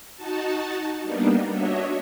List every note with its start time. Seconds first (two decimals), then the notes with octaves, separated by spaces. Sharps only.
0.16 D#4 F#4 A5
1.03 G3 A#3 B3 D4 D#4
1.51 D4 F#4 C#5 D#5 E5